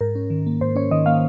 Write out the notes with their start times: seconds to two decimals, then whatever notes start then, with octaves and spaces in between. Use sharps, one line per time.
0.01 G#2 A#4
0.15 C#4
0.30 D#3
0.46 A#3
0.61 G#2 C5
0.76 C#4 C#5
0.91 D#3 D#5
1.06 A#3 F5